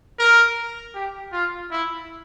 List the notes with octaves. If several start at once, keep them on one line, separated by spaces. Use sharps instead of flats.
A#4
G4
F4
E4